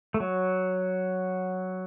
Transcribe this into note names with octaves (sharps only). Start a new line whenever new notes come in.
A3
F#3